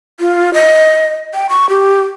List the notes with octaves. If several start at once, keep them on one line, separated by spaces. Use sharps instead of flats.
F4
D#5
G5
C#6
G4